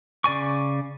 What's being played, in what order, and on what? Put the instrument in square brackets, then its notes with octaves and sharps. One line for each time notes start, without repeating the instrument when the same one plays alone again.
[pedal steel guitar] C#3 D5 G#5 C#6